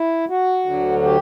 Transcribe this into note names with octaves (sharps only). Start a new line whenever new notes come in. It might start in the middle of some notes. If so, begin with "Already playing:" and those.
Already playing: E4
F#4
D2 D3 F#3
G4